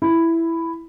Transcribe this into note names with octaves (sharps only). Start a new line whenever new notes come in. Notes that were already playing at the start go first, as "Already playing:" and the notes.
E4